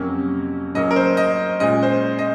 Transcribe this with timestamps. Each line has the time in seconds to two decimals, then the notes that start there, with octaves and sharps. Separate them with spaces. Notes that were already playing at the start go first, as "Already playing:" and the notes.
Already playing: F2 C3 F#3 A#3 C#4
0.74 C#3 F#3 A#3 C#4 D#5
0.91 A#4
0.96 C5
1.17 D#5
1.60 A#2 G#3 C#4 D#5
1.83 C5
2.19 D#5